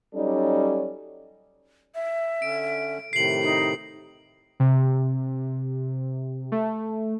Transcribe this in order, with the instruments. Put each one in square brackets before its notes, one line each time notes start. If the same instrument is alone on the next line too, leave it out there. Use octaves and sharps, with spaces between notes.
[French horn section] F#3 G3 C#4 D#4 A4 D5
[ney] E5
[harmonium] D3 C#4 [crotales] D7
[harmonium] A2 C3 D#3 [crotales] C7 F#7
[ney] D#4
[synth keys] C3
A3